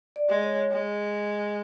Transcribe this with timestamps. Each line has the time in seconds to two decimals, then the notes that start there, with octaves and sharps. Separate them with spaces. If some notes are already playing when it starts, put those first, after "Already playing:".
0.16 D5
0.29 G#3
0.43 C#5
0.71 G#3